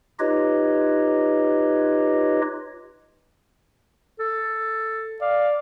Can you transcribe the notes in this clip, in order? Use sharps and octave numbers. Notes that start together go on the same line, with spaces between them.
D#4 F4 G4 B4 C#5 D#5
A4
D5 F5